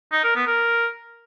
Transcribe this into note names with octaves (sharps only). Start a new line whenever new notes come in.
D#4
A#4
B3
A#4